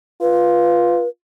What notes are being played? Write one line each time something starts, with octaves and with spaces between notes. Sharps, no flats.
F4 B4